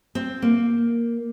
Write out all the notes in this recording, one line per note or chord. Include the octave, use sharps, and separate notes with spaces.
C4
A#3